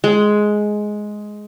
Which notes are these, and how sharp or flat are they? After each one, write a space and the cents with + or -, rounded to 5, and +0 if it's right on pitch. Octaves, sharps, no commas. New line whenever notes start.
G#3 +10